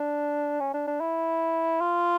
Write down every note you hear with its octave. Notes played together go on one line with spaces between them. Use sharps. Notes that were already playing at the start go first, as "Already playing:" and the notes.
Already playing: D4
C#4
D4
D4
E4
F4